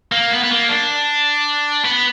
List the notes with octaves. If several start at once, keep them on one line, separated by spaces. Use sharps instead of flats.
A#3
B3
B3
A#3
D4
B3